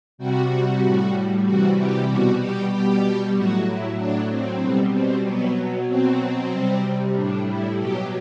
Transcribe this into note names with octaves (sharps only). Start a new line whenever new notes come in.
C3 G3 F#4
A2 G3
C3 E3 G3 F#4
G4
B2 G3 F#4
G4
B2 G3 G4
A2 F#3 F#4
E4
A2 F#3 D4
C4
B2 G3
C4
B2 F#3 B3
B2 F#3 C4
C3 G3
A2 G3 D4
E4
B2 F#3 G4